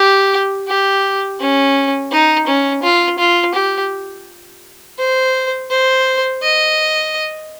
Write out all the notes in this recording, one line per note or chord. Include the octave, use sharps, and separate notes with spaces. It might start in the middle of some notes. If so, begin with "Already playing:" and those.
Already playing: G4
G4
C#4
D#4
C#4
F4
F4
G4
C5
C5
D#5